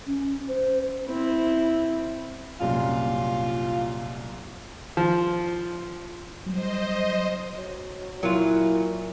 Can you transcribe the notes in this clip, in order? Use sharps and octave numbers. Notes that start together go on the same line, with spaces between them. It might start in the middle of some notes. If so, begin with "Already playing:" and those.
C#4
C5
C4 E4
C2 F#2 A#2 F4
F3
F#3 G3 C5 D#5
F#3
A#2 F#3 E4 F4